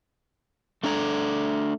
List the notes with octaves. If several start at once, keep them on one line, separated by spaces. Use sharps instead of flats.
A3 D4 A4 A#5